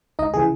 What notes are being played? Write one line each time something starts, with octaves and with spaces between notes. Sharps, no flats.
C#2 D#4 D#5
C#3 E3 G#4